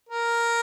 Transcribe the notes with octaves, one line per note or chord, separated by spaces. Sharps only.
A#4